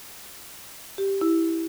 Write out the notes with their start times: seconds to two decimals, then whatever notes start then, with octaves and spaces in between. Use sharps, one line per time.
0.98 G4
1.21 E4